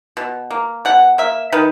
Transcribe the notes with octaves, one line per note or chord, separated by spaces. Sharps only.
B2
A#3
B2 F#5
A#3 E5
D#3 B4